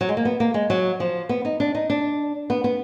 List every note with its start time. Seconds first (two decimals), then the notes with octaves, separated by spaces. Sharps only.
0.01 F#3
0.09 G#3
0.17 A#3
0.25 B3
0.40 A#3
0.54 G#3
0.70 F#3
1.00 F3
1.29 B3
1.45 D#4
1.60 D4
1.75 D#4
1.90 D4
2.50 B3
2.64 B3